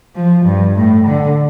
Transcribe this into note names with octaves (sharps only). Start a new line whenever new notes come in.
F3
G2
A2
D3